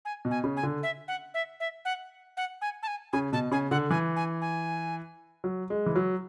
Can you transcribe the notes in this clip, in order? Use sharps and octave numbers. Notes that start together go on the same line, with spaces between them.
G#5
B2
G#5
C#3
G#5
D3
E5
F#5
E5
E5
F#5
F#5
G#5
A5
G#5
C#3 G#5
B2 A5
C#3 G#5
D3 F#5
E3 G#5
G#5
G#5
F#3
G#3
E3
F#3